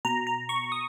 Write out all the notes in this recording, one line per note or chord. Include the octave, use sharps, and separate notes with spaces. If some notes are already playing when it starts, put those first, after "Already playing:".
B2 A#5
A#5
C#6
D#6